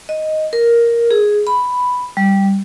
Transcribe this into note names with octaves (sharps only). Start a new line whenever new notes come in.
D#5
A#4
G#4
B5
G3